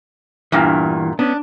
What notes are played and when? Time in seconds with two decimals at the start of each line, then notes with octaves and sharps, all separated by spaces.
0.52 E2 G2 A#2 E3
1.19 B3 C#4 D4